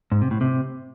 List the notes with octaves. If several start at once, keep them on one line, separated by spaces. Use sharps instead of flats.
G#2
C3
A2
C3